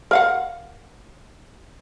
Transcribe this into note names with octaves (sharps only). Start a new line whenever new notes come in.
A#4 F5 F#5